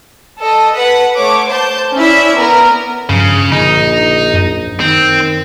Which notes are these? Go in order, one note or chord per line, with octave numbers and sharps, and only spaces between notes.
A4 D#5
B4 F#5
A3 C#5 D6
C5 A5 G6
C#4 E4 D5 E5
B3 A#4 B4
G2 C#3 F3
A#1 D3 D#4
F#2
D#3 C4